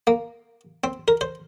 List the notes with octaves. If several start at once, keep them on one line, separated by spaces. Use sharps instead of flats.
A#3
C4
A#4
C5